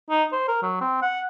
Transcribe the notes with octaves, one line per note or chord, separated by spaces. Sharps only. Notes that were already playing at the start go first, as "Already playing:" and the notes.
D#4
C5
A#4
F#3
C4
F#5